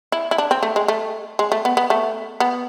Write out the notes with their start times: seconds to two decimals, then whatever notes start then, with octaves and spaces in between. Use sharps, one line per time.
0.12 E4
0.31 E4
0.38 D4
0.51 C4
0.63 A3
0.76 G#3
0.88 A3
1.39 G#3
1.52 A3
1.65 B3
1.77 B3
1.90 A3
2.40 B3